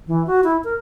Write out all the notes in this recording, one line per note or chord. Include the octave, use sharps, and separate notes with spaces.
E3
F#4
E4
A#4